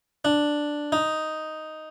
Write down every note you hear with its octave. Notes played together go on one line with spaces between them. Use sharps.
D4
D#4